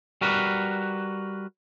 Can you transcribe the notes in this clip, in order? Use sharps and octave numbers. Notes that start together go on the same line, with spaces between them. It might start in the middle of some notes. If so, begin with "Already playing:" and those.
G3 F#4 A#4 B4